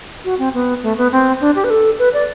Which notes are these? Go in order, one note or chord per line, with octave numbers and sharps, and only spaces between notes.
F#4
C4
B3
A3
B3
C4
D4
G4
B4
A4
B4
D5